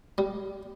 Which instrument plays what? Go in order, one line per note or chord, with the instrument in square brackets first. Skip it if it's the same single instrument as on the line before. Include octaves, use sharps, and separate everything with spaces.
[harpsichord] G3